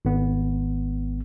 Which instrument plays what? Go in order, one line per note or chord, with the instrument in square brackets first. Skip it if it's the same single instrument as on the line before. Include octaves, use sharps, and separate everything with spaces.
[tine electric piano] G#1 B3